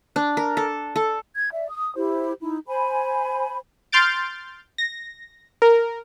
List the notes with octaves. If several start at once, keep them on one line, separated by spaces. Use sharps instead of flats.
D4
A#4
A4
A4
G#6
D5 E5
D#6
E4 G4 C5
D#4 E4
C5 G#5 B5
C6 F6 G6 A6 D7
A#6
A#4